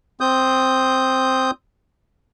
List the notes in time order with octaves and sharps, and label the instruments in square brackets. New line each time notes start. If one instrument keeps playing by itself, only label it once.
[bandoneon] C4 D#6 G6